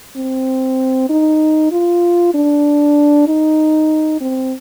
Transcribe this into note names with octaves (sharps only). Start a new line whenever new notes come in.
C4
D#4
F4
D4
D#4
C4